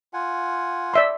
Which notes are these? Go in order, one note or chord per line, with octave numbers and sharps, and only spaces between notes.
F4 F#5 G#5
D5 E5 C6